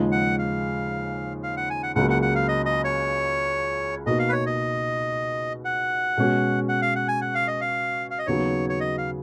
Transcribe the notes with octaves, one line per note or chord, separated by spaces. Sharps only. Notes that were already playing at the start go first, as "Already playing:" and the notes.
Already playing: D#2 C#3 F3 G#3 D#4
F#5
F5
F5
F#5
G#5
F#5
C#2 C#3 F#3 A#3 F#5
F#5
F#5
F5
D#5
D#5
C#5
B2 A#3 D#4 F#4 D#5
F5
B4
C#5
D#5
F#5
B2 G#3 C#4 F#4
F#5
F5
F#5
G#5
F#5
F5
D#5
F5
F5
D#5
D#2 C#3 F#3 B3 C#5
C#5
D#5
F5